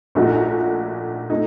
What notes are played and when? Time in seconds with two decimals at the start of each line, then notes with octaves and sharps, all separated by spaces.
0.15 A#1 A#2 A3 D#4 F#4
1.30 A3 D#4